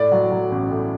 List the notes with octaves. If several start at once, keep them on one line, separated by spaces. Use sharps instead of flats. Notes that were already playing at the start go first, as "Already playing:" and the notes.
Already playing: A2 D5
F#3
F#3
A1
A2